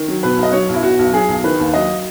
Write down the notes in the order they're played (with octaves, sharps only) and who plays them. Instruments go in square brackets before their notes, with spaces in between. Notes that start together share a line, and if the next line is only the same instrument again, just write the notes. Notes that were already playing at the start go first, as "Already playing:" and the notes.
Already playing: [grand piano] D#3
F#3
B2 B4
B1
D#5
F#3 C#5
B1 E4
B2 F#4
B1
F#3 G#4
B1
D#3 B4
D#2
F#3 D#5